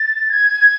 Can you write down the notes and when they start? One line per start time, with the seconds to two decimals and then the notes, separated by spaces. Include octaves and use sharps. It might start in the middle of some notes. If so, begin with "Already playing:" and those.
Already playing: A6
0.30 G#6